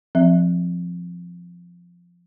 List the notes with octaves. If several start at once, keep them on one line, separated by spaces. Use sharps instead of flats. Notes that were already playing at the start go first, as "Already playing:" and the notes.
F3 C4 E5